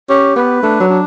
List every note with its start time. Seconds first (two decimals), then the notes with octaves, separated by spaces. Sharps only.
0.09 C#4 G4
0.36 B3 B4
0.63 A3 D4
0.80 F#3
0.89 D4